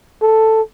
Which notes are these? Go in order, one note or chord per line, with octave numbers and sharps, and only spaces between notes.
A4